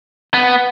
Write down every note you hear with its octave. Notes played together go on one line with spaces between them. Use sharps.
B3